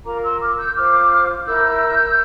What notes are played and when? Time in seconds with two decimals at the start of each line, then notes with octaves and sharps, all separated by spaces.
0.04 F4 A#4 A#5 D6
0.22 C6 E6
0.40 D6 F6
0.57 E6 G6
0.74 F4 C5 D6 F6
1.45 E4 A#4 E6 G6